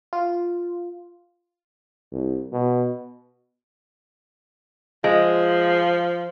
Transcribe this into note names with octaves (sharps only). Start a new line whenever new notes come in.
F4
C2
B2
F3 G#3